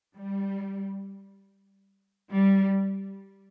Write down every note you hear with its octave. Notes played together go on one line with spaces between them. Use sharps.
G3
G3